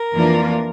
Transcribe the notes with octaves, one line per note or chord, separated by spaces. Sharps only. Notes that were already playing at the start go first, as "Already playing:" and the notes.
Already playing: A#4
F2 E3 A#3 D4 F4